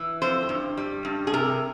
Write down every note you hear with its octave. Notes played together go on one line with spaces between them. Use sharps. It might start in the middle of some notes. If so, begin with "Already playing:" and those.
Already playing: E3
F2 C5
G2
G3
G2
G#4
C3 A#4